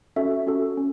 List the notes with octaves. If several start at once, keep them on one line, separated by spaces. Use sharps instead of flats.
C#4 F#4 A4 E5
C#4 F#4 A4
C#4